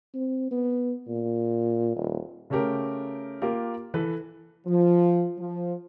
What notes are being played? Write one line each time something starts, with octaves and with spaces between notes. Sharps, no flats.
C4
B3
A#2
D#1
C#3 A3 C#4 G4 A#4
A#3 F4 G4 A#4
E3 A4 B4 B5
F3
F3